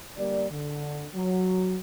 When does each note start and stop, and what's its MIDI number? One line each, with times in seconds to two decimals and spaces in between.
0.17 0.45 50
0.17 0.45 55
0.17 0.45 58
0.17 0.45 74
0.51 1.05 50
1.15 1.78 54